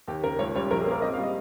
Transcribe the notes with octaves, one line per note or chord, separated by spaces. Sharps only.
D#2 G4
C#3 A#4
C#2 C#5
G3 C#5
A#1 A#4
G#4
A#3 A#4
C4 D#5
F5
G3
D#5